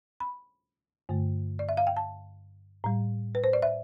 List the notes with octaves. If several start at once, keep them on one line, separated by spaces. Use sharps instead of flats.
B5
G2 D3 A3
D5
E5
F5
G5
A5
A2 G3
B4
C5
D5
E5